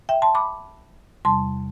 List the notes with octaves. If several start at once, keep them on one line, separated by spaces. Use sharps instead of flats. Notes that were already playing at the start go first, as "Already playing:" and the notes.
E5 G5
A5 C6
B5 D6
E2 C3 G3 A5 C6